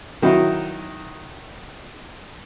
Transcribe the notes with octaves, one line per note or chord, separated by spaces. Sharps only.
D#3 F#3 D#4 E4